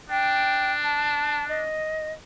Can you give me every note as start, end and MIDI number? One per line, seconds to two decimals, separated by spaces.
0.10 1.67 62
0.10 0.72 79
0.83 1.47 81
1.48 2.13 75